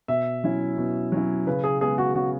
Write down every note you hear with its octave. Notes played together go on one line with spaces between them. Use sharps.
B2 E5
F#3 C#4 E4
B2
F#3 C#4 E4
C#3 B4
G#4
G#3 B3 G#4
F#4
C#3 F#4